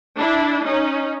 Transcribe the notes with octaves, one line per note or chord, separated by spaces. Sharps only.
D4 E4
C#4 D#4